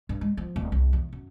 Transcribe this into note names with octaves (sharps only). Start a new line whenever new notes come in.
G2
G#3
F3
D1
C2
E2
F#2